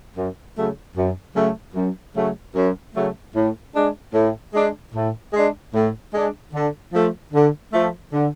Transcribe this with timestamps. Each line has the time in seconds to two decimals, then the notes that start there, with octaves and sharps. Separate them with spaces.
0.15 F#2
0.55 C#3 F#3 A3
0.95 F#2
1.35 C#3 F#3 A3
1.75 F#2
2.15 C#3 F#3 A3
2.55 F#2
2.94 C#3 F#3 A3
3.34 A2
3.74 G#3 D4
4.14 A2
4.54 G#3 D4
4.94 A2
5.33 G#3 D4
5.73 A2
6.13 G#3 D4
6.53 D3
6.93 F3 A3
7.33 D3
7.73 F3 A3
8.12 D3